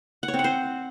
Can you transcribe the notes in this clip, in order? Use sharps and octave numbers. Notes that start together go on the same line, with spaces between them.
F#5
C#5
C4
F#5
C5